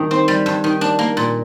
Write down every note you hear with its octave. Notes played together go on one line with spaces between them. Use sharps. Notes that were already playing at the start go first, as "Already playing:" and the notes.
Already playing: G2 D#3 G3
C4
G3
G2
D#3
D4
A#3
A#2